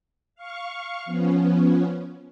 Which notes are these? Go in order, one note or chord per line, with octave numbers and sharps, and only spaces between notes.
F5 C#6
F3 B3 C#4